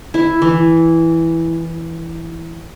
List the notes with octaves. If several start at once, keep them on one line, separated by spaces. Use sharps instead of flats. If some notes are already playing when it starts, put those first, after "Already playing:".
E4
E3